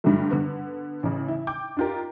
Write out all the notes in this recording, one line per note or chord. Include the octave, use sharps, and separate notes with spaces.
G2 D3 D#3 F#3 G3 A3
D3 B3
A1 C#3
E4
G5 D6 G6
D4 D#4 F4 G4 A#4